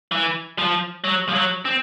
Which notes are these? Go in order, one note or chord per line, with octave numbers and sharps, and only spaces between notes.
E3
F3
F#3
F3
F#3
C4